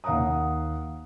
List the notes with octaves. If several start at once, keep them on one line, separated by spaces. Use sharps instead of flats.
D#2 F5 F#5 A#5 D#6